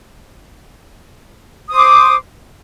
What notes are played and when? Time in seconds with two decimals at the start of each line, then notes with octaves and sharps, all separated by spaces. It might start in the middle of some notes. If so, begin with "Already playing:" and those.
1.68 D#6
1.71 C5
1.75 D6
1.79 C6